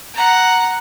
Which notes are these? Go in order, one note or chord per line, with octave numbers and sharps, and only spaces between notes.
F#5 A#5